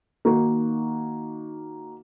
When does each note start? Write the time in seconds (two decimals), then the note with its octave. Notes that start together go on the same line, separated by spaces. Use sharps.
0.25 D#3 A#3 D#4 F#4